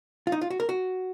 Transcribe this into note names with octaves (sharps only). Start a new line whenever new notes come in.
F4
D#4
F4
F#4
A#4
F#4